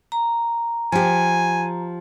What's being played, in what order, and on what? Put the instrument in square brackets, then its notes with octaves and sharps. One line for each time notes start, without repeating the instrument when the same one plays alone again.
[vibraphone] A#5
[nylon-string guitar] F3 G4 [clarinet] G#5